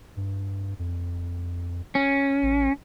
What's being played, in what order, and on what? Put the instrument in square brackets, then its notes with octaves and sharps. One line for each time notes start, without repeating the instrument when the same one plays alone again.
[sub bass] G2
F2
[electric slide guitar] C#4
[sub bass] A1